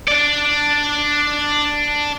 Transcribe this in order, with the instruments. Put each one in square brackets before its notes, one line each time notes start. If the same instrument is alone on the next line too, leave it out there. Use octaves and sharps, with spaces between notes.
[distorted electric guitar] D4 D5